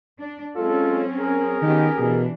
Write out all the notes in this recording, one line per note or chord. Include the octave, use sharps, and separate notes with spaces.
D4
F#3 G#3 C4 C#4 F4 A4
G#4 A#4
D#3 B3 C#4 G4
B2 E3 D4